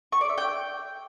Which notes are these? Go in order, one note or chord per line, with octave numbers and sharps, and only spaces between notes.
C#6
D5
E5
G5